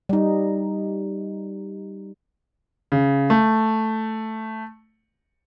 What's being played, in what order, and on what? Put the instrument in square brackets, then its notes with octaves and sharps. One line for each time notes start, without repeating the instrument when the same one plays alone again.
[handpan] G3 D#4
[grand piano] C#3
A3